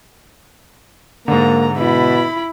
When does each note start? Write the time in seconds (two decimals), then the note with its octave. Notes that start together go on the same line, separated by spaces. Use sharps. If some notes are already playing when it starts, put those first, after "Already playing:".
1.28 G#2 D3 A#3 A#5
1.77 B2 E4 B5